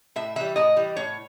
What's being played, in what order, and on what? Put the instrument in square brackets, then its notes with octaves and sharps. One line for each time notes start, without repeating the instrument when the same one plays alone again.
[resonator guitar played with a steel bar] A2 E5
E3 G3 E5
A2 D#5
E3 G3
A2 C#5